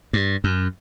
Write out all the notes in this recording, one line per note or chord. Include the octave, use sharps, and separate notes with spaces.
G2
F#2